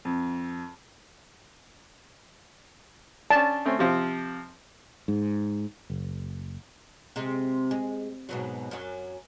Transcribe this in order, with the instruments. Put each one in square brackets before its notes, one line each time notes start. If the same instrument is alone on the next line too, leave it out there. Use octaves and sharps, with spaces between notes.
[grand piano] F2
[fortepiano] C#4 D4 [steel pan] A5
[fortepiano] A3 C4 C#4
C3 F3 C4
[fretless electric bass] G#2
F#1
[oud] C3 G#3
G#3
G#2 B2 F#3
F#2 F#3